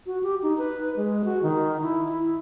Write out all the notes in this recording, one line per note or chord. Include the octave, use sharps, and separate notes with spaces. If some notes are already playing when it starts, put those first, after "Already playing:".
F#4
G4
D#4
B4
G#3
F#4
D#3
E4
E4